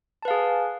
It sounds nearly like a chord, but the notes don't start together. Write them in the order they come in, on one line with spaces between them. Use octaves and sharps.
A5 B4 F5 G#4 G#5